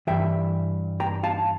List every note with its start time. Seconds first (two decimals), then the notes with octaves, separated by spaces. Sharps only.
0.07 G2 E3 E5 G5
1.00 G5 A#5
1.23 F5 A5